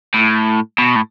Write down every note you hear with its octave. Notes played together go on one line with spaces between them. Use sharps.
A2
B2
A2